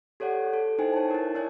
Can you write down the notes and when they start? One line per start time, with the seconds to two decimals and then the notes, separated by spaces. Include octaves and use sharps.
0.20 G4 A4 C#5 D5 F#5
0.53 A4
0.79 D#4 E4 C5 G5 G#5
0.93 C#5 A5
1.11 E4 A#4
1.35 D#4 E4 C#5 D5 G#5